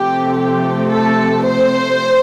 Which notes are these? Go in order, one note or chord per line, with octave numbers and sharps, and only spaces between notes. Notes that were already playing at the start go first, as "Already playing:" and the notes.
Already playing: C3 F3 A3 C4 G4
G4
A4
C5